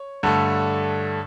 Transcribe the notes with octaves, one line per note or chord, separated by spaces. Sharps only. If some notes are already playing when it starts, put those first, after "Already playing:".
Already playing: C#5
G2 D3 A3